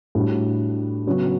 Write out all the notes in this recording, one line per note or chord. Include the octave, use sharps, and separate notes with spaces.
A2 G3 D4 F#4
C#3 F#3 B3 F#4 C#5